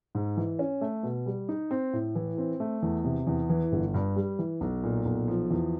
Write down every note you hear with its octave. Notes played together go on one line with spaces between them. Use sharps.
G#2
E3
C#4
A3
B2
G3
D#4
C4
A2
E3
C4
A3
E2
C3
E2
E3
G1
G2
G3
E3
B1
A#2
B1
F3
E2